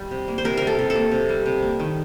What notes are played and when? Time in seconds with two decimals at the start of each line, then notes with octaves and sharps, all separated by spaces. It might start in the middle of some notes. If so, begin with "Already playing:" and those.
Already playing: G3
0.11 C3
0.28 A#3
0.38 C5
0.45 C3 A#4
0.57 G3 A#4
0.67 A4
0.79 C3
0.90 A4
0.95 A#3
1.11 C3
1.29 G3
1.46 C3
1.62 A#3
1.80 D#3